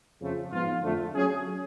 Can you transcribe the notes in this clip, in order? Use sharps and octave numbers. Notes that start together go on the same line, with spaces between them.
F2 C#3 F3 A3
G#2 F3 B3 F4
F2 D3 F3 A3
F#3 C#4 G#4